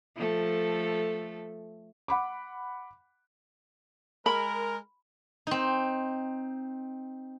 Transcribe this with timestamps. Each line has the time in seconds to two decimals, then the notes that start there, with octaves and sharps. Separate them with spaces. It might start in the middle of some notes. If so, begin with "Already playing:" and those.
0.16 F3 A3 A4
2.08 F#5 B5 D6
4.26 G#3 A#4 B5
5.47 C4 D#4